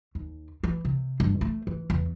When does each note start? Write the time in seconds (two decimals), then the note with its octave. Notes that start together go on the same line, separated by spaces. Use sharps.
0.15 D#2
0.63 E3
0.85 C3
1.20 G2
1.41 A3
1.67 E3
1.90 E2